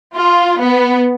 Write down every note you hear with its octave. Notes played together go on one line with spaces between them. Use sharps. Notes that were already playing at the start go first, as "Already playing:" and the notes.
F4
B3